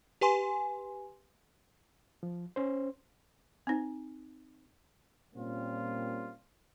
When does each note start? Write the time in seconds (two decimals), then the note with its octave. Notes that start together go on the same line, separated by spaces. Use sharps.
0.21 G4 B4 G#5 C6
2.23 F3
2.56 C#4 C5
3.67 C4 D#4
5.35 A#2 G3 A#3 C4 C#4 F4